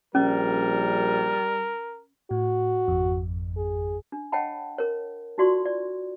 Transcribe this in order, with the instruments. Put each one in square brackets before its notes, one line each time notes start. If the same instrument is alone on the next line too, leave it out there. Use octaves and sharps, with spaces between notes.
[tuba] A#1 [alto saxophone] G3 [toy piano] C#4 [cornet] A#4
[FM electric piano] A2 [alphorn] F#4
[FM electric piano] G#1 F2
[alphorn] G#4
[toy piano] D4
C#5 D#5 F#5 G5 A5 B5
A#4 C#5
D#4 F4 F#4 D5 C6 C#6
D5